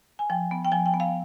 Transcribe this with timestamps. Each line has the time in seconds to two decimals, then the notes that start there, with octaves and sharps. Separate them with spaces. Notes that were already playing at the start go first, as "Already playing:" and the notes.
0.19 G#5
0.30 F3 G5
0.51 B3
0.65 G5
0.72 F3 G#5
0.86 G5
0.94 B3
1.00 F5